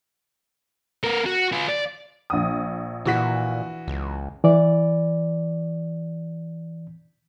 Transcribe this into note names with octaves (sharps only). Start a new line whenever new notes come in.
B3 A#4
F#4
F4 B4
D5
A#1 D#6
A#2 E3 F#4 B6
C#2
E3 D5